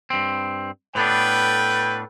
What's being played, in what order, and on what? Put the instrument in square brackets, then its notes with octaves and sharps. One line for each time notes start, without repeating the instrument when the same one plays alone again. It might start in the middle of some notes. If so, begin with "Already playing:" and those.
[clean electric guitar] G2 C4
[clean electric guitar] A2 B3 D4 [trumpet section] A4 B4 G5